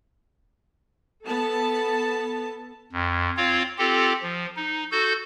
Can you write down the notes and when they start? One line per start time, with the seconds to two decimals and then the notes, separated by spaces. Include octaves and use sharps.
1.24 B3 A4 A5
2.93 F2
3.37 C4 F4 C#5 F5
3.79 C4 F4 G4 A4
4.23 F3
4.57 D#4
4.92 F#4 A4 G6